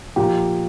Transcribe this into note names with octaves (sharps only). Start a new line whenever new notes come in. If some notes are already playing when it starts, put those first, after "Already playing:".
A#2 F3 A#3 G4